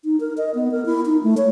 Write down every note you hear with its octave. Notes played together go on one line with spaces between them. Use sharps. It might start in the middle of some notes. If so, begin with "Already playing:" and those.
D#4
A#4
D#5
B3
A#4
E4
D#4
A3
C#5